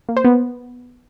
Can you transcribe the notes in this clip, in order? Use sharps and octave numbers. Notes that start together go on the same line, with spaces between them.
A#3
C5
B3